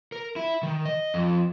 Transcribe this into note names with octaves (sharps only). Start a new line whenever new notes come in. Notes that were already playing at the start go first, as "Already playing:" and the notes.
A#4
E4
D#3
D#5
F2